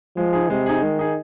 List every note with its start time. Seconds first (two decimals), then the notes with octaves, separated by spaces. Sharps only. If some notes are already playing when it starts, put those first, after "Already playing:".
0.17 F3 G#3
0.33 D#4 G#4
0.49 C3 G#3
0.66 D#4 G#4
0.82 D#3 G#3
0.99 D#4 G#4